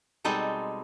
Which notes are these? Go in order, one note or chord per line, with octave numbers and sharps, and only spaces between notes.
B2 G3 G#3 C4 D#4 A4